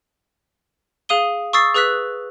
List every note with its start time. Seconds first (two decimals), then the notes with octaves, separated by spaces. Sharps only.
1.09 G#4 F5 D#6 D#7 G7
1.53 C#6 D#6 E6 A6 C7
1.75 G#4 B4 E6 F#6 B6